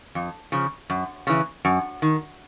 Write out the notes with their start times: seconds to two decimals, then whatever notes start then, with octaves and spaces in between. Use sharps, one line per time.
0.15 F2
0.52 C#3 F3
0.90 F#2
1.27 C#3 E3
1.65 F#2
2.02 D#3